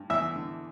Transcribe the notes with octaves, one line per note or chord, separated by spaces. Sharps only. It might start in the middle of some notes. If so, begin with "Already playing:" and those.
Already playing: G2
E2 E5
D3